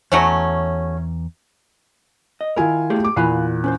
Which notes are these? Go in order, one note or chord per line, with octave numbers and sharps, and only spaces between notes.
E2 F#3 A3 C#4 A#5
D#5
D#3 E4 F4 A#4 G#5
A3 G4 G#4
D6
E2 A#2 F5 G#5 B5 F#6
C#4 B4 C5